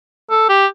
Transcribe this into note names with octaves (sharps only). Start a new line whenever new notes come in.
A4
G4